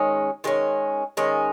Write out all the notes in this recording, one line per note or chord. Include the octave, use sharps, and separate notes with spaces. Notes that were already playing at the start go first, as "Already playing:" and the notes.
Already playing: D#3 G#3 C#4
D#3 G#3 C#4
D#3 G#3 C#4